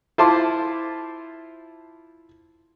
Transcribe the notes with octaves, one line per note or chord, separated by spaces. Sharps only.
E4 F4 C5 A5 C6 D6